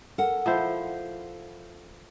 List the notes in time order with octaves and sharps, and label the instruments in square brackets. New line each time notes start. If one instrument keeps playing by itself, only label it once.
[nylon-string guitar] A4 A#4 F#5
[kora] F3 E4 C5